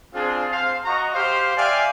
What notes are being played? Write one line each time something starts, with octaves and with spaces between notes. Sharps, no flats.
C4 D4 F4 G#4
C4 C5 F5
F#4 D#5 A#5 C#6
G4 C5 F5
D5 E5 F5 G5 G#5